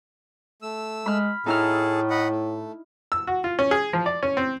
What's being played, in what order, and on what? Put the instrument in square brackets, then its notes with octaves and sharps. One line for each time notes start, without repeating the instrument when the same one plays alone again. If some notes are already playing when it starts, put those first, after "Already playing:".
[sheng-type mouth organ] A3 E6
[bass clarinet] G#3 [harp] B5 F6
[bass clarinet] A2 [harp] D#4 E4 F6 [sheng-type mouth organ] G#4 A4
[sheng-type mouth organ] D#5 F#5 B5
A3
[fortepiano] E6
F#4
F4
C#4
G#4
F3
D5
C#4
C4